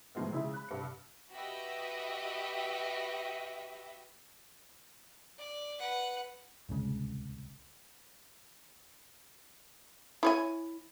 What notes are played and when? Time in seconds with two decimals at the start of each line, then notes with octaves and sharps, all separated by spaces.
0.15 A2 D#3 F3 G#3 B3
0.33 C#3 G#3 E4
0.54 B5 F#6
0.69 C2 G2 C#7
1.33 F#4 G4 B4 D#5 E5
5.39 D5
5.79 B4 F#5
6.69 D1 C2 C#3 G#3
10.23 E4 C#5 G#5